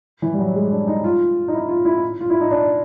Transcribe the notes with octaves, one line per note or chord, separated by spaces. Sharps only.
E3
G3
F#3
G#3
D4
D#4
F4
D#4
E4
F4
E4
F4
E4
D#4
D4